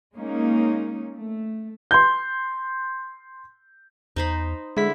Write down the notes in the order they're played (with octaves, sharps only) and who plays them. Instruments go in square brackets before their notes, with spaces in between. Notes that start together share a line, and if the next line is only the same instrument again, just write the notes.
[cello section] G#3 A#3 C#4 D#4
A3
[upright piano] C6 G6
[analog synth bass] E2 [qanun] D#4 C5 B5
[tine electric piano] D3 E4 B6 [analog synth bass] G#3 [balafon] G#4